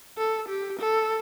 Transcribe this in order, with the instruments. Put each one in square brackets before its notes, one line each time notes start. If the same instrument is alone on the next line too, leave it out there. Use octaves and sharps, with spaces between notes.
[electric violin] A4
G4
A4